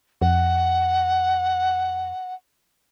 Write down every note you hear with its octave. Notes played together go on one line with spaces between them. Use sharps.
F2 F#5